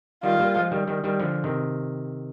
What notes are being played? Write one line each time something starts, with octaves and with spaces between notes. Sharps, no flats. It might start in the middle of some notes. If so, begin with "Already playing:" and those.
D#3 G3 F4
G3 A#3
F3 G#3
D#3 G3
D#3 G3
D#3 G3
D3 F3
C3 D#3